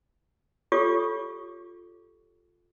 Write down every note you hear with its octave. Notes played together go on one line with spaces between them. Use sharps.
F4 G4 A4 C#5 C#6 D6